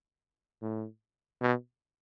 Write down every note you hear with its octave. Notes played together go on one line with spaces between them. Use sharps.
A2
B2